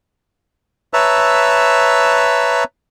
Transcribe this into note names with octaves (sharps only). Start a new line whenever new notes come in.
B4 C#5 E5 A5 A#5 E6